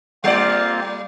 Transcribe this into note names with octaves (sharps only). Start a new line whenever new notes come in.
G3 A#3 C4 F4 D5